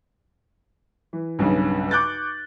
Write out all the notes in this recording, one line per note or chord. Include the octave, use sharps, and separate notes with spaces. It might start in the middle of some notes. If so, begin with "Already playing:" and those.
E3
B1 G2 C#3
C#6 D6 F#6 G6 A6